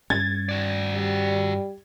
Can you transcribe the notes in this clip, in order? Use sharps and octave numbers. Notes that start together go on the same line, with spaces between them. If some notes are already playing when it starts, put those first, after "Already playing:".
G2 C#4 G#6 A6
F#4 D5
G3